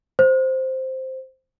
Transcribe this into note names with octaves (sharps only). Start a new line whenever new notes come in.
C5